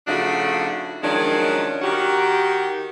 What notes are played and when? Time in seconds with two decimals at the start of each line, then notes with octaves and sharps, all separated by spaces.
0.07 C#3 F3 A3 D4 D#4 F#4
1.03 D#3 F3 F#3 G#3 C#4 D4
1.82 D#3 F#4 G4